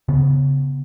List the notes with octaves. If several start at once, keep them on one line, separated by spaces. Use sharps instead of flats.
C#3 B3